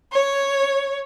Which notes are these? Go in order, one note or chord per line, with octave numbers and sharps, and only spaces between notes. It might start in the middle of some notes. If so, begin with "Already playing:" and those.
C#5